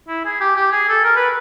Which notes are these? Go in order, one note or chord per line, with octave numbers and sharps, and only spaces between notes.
E4
G#4
G4
G4
G#4
A4
A#4
B4